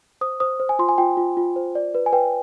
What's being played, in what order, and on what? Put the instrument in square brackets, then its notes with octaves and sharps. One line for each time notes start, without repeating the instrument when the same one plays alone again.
[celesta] C5 D#6
C5 D#6
C5
G#5
F4 C6
G#5
F4 G5
F4
F4
C5
D5
B4
G#5
B4 G5